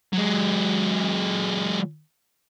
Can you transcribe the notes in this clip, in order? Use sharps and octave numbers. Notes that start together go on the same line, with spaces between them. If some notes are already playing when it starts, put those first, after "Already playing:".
F#3 G#3